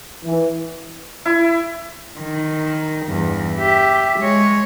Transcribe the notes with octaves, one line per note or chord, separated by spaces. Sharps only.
E3
E4
D#3
E2 G2
G4 E5
G#3 C#5